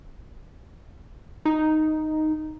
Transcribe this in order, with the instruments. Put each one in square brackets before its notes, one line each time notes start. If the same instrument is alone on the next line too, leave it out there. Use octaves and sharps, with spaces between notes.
[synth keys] D#4